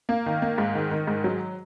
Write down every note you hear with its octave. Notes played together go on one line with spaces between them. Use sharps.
A#3
D#3
A#3
G#2
D#3
D#3
G#2
F#3